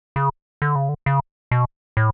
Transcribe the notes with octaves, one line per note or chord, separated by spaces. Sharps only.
C#3
D3
C#3
D3
C#3
B2
A2